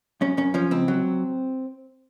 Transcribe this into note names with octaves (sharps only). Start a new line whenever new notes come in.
F#2 C#4
F#2 C#4
F3 C#4
C#2 C4
F#3